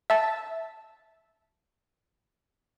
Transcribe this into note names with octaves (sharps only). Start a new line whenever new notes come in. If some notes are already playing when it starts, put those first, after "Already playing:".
E5 A5